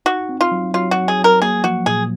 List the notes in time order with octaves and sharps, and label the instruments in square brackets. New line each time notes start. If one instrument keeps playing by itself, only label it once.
[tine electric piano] D#4 [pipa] F#4
[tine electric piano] C4
[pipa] F4
[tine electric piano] F#3
[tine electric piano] F#3 [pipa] F4
[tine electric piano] F#3 [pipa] F#4
[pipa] G#4
[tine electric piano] F#3
[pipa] A#4
[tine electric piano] A#3 [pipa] G#4
[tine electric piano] F3 [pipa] F#4
[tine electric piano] A#2 [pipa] G#4